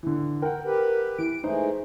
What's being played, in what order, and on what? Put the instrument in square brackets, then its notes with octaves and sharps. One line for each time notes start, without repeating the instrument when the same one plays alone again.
[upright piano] D3 E3
[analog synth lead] A#4 [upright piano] F#5 G5
[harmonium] G4 B4
[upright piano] E3 [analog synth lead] D7
[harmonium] E3 G#3 A3 [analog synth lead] D#4 [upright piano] C5